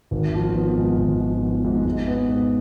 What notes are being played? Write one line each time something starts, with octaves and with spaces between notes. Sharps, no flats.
G#1
F3
B3
G#2
G#1
F3
B3
G#2
G#2
B3
G#2